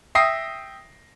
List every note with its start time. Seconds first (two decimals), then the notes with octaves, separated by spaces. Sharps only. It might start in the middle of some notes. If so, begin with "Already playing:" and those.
0.15 E5 G5 D#6 A#6 C7